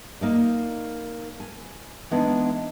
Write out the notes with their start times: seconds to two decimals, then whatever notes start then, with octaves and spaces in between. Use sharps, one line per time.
0.21 A#3 D#4 D5
1.40 G#5
2.11 E3 G#3 B3 D4 D#4